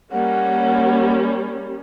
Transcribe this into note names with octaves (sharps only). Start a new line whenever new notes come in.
G3 A#3 C#4 F#5